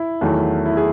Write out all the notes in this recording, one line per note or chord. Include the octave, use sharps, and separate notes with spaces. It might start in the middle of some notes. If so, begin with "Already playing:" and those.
Already playing: E4
E2 D#3 F#3 A3
E4
G#4